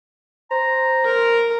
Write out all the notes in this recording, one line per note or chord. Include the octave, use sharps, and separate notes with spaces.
C5 A#5
A#4